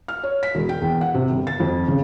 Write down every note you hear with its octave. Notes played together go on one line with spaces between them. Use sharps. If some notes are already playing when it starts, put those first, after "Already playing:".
F6
C#5
B6
E1
G5
E2
F#5
C3
G1
A6
F2
C#3